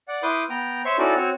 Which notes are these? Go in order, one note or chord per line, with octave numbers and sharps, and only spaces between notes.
D5 F#5
E4 B4 C6 D6 D#6 G6
B3 G5 A#5
C5 C#5 E5 C6 C#6
C#4 D#4 E4 F#4 A4 D5
C4 F#4 C#5